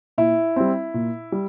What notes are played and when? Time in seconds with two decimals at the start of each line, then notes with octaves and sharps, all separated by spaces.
0.18 A#2 E4
0.56 G3 C4
0.94 A#2
1.32 G3